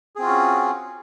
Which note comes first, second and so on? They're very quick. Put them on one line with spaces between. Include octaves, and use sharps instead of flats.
G#4 C4 F4 F#4 C#4